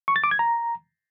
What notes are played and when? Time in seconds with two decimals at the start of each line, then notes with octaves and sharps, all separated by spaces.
0.08 C#6
0.16 A6
0.24 D6
0.31 G#6
0.39 A#5